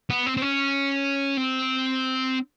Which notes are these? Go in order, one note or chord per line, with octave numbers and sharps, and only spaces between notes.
B3
C4
C4
C#4
C4